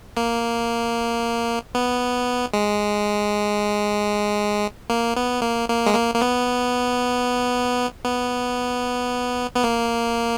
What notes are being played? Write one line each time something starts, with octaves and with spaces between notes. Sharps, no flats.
A#3
B3
G#3
A#3
B3
A#3
A#3
G#3
A#3
A#3
B3
B3
B3
A#3